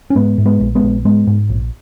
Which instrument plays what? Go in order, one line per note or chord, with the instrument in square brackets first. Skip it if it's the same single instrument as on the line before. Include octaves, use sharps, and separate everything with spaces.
[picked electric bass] C#4
G#2 G#3 B3
G#2
G#3 B3
A#1
G#3 B3
A#1
G#2 G#3 B3
G#2
A#1